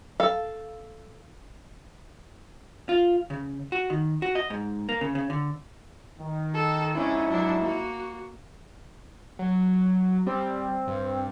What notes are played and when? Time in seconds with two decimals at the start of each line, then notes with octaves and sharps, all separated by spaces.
0.20 A4 F5
2.89 F4
3.30 C#3
3.72 F#4
3.90 D#3
4.22 F#4
4.35 D#5
4.50 G#2
4.89 A#3
5.01 C#3
5.15 C#3
5.30 D3
6.20 D#3
6.54 A4
6.94 F2 G#2 C#4 D4 E4
7.29 F#3 D4
7.61 A#3 F#4
9.39 F#3
10.26 G3 C4
10.87 G2